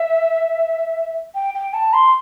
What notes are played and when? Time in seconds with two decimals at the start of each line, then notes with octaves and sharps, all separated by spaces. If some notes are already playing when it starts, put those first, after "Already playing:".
Already playing: E5
1.35 G5
1.54 G5
1.73 A5
1.93 C6